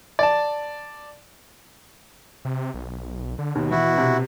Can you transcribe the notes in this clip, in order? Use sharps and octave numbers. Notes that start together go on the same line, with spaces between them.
D5 A5
C3
B1
D3
D#2 B2
E3 E4 F#4
C3